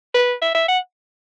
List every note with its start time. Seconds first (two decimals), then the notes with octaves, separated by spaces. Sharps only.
0.14 B4
0.42 E5
0.55 E5
0.68 F#5